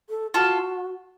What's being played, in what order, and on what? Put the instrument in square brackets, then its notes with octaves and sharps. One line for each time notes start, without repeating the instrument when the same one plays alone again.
[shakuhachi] A4
[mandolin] F4 A4 [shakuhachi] F#4